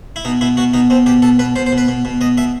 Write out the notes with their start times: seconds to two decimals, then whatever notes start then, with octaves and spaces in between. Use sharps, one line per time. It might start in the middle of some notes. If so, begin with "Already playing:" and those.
0.16 E4
0.25 B2 D#4
0.41 B2 E4
0.57 B2 F#4
0.74 B2 D#4
0.90 B2 C4
1.06 B2 G4
1.22 B2 A4
1.39 B2 B4
1.56 B2 C5
1.66 C5
1.72 B2
1.78 B4
1.88 B2
2.05 B2
2.21 B2 D#5
2.38 B2 E5